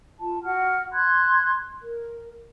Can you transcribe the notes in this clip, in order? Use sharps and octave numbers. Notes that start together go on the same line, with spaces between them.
F4 A5
F#4 F#5 F6
B5 C6 F#6 G#6
A#4